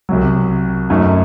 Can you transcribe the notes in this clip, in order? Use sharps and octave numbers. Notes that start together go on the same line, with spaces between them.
C2 C3 F#3
F#2 F#3 A3 D#4